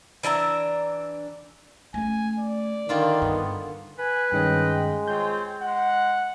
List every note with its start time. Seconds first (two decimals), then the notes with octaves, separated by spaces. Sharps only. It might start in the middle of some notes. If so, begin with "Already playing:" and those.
0.23 E3 D4 E5 A#5
1.94 A3 C#4 G#5
2.39 D5
2.89 D3 D#3 A#3 F4
3.22 G2 B3
3.98 B4 G#5
4.32 G2 D#3 G#3 C#4 D#5 G5
5.08 C4 F4 C5 C#5 G6
5.61 G#3 F#5